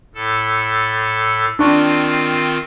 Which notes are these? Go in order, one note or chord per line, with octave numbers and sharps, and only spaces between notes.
A2 A4 E6
D#3 C4 D4 F4 C#6